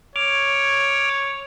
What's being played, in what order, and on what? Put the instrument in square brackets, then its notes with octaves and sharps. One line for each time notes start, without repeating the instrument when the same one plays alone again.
[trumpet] C#5 [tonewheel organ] D6 F6